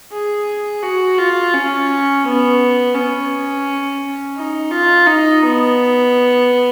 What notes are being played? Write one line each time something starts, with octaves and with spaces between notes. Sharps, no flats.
G#4
F#4
F4
C#4
B3
C#4
D#4
F4
D#4
B3